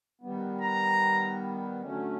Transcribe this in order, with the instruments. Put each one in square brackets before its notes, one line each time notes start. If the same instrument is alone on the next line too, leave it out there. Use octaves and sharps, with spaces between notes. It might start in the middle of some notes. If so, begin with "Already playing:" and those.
[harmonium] D#3 G3 B3
[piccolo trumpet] A#5
[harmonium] D3 F#3 A3 C#4